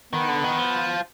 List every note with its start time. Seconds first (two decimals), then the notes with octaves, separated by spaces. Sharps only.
0.13 D#3 B3
0.28 D3
0.44 D#3
0.59 F3